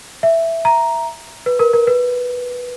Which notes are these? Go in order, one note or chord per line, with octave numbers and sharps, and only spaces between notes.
E5
A#5
B4
A#4
A#4
B4